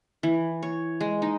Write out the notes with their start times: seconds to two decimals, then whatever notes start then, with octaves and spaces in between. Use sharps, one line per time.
0.23 E3
0.63 C#5
1.01 G#3
1.22 D#4